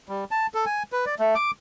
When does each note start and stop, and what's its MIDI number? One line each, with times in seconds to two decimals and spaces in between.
0.09 0.24 55
0.31 0.47 81
0.54 0.65 69
0.66 0.83 80
0.92 1.05 71
1.06 1.15 74
1.19 1.35 57
1.35 1.51 86